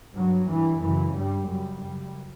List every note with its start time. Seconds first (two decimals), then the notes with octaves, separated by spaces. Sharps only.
0.14 G2 F#3
0.48 G2 E3
0.81 F#2 C#3 E3
1.14 G2 G3
1.47 F#2 C#3 G3
1.82 F#2 C#3